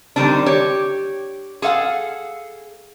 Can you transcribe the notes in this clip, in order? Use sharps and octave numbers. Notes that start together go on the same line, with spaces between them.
D3 D#3 G3 C4 D4
G4 C#5
G#4 A4 F5 F#5